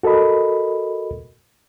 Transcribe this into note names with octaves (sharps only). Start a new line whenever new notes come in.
F#4 A4 A#4 D#5 B5